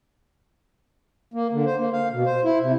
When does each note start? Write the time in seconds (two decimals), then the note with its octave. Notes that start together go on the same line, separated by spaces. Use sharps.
1.34 A#3
1.52 D3
1.66 C5
1.79 A#3
1.93 F5
2.12 B2
2.26 C5
2.44 E4
2.62 C3